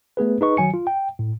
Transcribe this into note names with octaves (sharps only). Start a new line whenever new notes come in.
A3 B3 G#4 B4
D#4 G#4 B4 D#5 C#6
D#3 F#3 G#5 C#7
F4
G5
A2